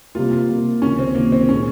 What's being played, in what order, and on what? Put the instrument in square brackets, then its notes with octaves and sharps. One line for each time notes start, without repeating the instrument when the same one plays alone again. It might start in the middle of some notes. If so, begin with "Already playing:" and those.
[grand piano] C3 G3 A#3 [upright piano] F4
[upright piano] F4
[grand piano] C3 G3 A#3
[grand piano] C#2 C3 D#3 [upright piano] C#4
[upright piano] C4
[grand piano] C#2 C3 D#3 [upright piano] A#3
[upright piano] C4
[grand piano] A#2 G#3 C4 [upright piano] C#4